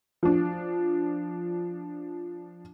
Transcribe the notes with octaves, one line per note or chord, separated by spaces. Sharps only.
F3 D4